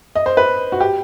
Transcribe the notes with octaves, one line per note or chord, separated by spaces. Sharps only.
D#5
C5
B4
F#4
G4